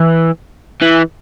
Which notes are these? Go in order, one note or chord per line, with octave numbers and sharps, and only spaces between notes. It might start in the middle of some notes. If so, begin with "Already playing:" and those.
Already playing: E3
E3